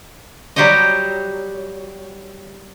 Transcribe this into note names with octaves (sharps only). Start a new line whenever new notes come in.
F#3 G3 G4 C5 C#5 D#5